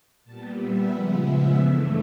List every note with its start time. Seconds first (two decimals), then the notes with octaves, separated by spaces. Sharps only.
0.25 A#2 G3 B3 A5
0.57 E5
0.89 C#3 F3 G#3 B3
1.20 E5
1.52 G2 E3 A3 E5